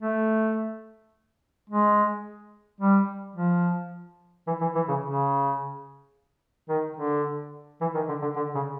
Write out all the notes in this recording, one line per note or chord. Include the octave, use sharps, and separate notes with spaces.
A3
G#3
G3
F3
E3
E3
E3
C#3
C#3
D#3
D3
E3
D#3
D3
D3
D3
C#3